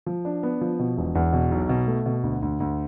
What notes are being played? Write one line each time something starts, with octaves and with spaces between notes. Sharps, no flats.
F3
D4
B3
F3
B2
E1
E2
B2
B1
B2
A3
B2
D2
D2
D2